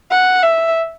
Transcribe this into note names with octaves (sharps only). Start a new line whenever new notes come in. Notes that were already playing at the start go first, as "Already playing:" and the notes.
F#5
E5